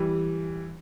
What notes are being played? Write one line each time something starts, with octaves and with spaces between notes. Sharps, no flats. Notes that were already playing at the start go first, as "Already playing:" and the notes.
Already playing: E3 G3